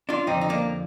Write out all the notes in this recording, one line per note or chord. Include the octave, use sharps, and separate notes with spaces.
D4 F4
F2 D3 F3 C4 D#4
D#4
A#3 D4